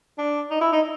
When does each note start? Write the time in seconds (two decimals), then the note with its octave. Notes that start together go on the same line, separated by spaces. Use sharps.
0.18 D4
0.51 D#4
0.61 E4
0.73 D#4